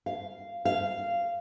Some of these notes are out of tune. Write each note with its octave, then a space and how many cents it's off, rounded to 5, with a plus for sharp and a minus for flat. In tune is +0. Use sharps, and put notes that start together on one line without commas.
F5 -10
F5 -15